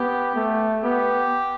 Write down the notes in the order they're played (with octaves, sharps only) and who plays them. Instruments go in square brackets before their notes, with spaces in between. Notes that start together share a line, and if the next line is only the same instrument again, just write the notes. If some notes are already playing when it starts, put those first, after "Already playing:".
Already playing: [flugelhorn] B3 [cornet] G4
[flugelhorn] A3
[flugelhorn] B3 [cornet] G4